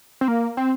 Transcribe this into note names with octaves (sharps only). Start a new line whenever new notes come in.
C4
A#3
C4